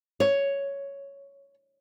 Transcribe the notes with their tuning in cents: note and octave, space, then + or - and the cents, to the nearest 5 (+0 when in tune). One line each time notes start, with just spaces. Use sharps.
C#5 +5